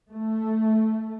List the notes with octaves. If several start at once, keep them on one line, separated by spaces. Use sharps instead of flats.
A3